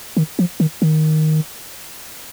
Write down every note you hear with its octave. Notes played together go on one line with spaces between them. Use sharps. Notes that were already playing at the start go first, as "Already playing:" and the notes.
D#3
F3
D#3
D#3